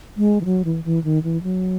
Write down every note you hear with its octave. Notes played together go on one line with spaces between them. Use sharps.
G#3
E3
F#3
E3
E3
D#3
E3
F#3